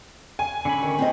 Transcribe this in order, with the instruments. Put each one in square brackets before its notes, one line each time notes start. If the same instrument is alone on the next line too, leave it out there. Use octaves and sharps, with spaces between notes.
[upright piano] G#5
[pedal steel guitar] D3 C#4 B5
[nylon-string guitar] D#3
C4 F4 D#5